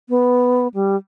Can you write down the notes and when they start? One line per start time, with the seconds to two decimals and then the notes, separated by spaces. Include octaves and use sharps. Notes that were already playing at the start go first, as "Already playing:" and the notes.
0.09 B3
0.74 G3